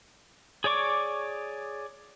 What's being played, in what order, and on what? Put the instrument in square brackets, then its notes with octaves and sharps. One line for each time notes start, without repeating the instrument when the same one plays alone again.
[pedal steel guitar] G#4 C#5 D5 C#6 D6